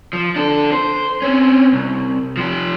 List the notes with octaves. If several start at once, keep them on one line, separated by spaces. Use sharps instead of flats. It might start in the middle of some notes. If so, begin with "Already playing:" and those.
F3
D4 A4
C5
C4 C#4
C2
F3 G4